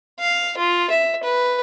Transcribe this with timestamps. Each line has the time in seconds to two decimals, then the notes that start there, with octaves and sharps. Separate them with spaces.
0.20 F5
0.58 F4
0.90 E5
1.23 B4